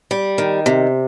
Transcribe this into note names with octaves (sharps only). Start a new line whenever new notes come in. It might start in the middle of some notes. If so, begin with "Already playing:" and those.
G3
D#3
C3